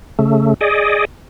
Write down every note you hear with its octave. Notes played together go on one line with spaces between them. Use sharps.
C#3 A3
G#4 D5 D#5